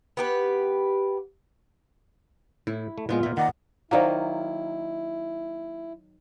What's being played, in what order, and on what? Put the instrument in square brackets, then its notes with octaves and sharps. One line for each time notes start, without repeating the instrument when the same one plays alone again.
[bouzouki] B3 G4 B4
[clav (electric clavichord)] A2 [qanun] E4
[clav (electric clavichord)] A3
[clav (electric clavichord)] A#2 G#3 [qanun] B3 F4
[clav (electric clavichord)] A#2 E5 [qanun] A#3
[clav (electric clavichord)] D#3 D5 A#5 [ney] F#5
[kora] D#3 F#3 A#3 [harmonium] E4 [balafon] C5 D5 F5